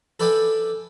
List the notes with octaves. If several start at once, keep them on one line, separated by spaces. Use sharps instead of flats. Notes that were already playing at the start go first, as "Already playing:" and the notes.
A4 B4 D5 E5 G5 G#5